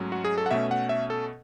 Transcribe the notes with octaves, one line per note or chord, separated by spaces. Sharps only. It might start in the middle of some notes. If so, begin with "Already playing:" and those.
Already playing: G#2 F#3 A3 C#4
F#4
G#4
A4
F#5
B2 A3 C#4 E5
F#5
E5
A4